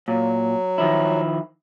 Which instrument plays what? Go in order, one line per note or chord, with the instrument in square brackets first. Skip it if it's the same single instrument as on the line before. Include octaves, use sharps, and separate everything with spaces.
[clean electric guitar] A#2 [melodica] F#3
[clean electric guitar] D#3 F3 E4